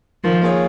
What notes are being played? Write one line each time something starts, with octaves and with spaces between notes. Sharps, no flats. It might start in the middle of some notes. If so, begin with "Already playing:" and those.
D#3 F3
A#3 F4 G#4 C#5